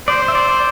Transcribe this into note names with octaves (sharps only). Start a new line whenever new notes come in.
C5 D5
E5
D5